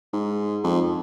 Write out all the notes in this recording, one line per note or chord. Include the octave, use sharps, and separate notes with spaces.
G#2
F2